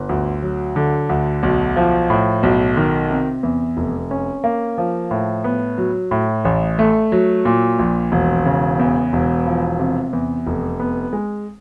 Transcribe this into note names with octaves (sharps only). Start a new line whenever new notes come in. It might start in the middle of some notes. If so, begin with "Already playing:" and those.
Already playing: G1
D2
F#3
D3
D2
B1
F3
A2
B1
D#3
C3
E2
F1
C#4
A#3
F3
A2
B3
F#3
A2
A1
A3
F#3
A#2
A#1
E1
C#3
E2
E1
F3
C3
E2
F1
B3
G#3